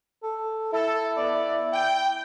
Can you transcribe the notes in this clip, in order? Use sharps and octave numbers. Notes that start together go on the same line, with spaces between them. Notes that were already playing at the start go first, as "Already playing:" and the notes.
A4
E4 A4
B3 D5
G5